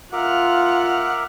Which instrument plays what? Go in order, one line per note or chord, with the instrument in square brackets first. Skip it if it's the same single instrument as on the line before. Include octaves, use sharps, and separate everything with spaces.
[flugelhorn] F4 [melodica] A#4 E5 D6 [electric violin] F#5 F6